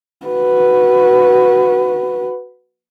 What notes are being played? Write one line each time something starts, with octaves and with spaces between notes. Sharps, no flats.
F#4 B4